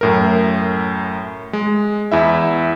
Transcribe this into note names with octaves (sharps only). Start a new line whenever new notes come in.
F#2 A2 A#4
G#3
E2 E4 E5